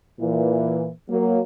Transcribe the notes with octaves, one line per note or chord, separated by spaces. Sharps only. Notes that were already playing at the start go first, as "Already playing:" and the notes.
A#2 E3
F#3 A#3